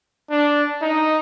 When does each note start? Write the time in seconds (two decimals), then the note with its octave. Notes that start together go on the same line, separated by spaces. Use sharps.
0.30 D4
0.82 D#4